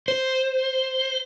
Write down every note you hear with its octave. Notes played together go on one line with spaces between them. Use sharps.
C5